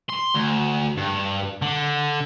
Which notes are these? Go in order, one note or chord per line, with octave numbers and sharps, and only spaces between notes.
C6
D2
G2
D3